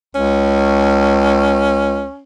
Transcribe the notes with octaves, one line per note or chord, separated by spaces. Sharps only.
C#2 C#4